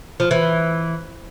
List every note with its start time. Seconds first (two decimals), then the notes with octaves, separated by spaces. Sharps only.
0.20 F3
0.31 E3